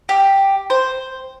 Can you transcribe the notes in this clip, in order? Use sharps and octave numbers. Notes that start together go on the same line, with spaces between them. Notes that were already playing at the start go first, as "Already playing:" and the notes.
G4
C5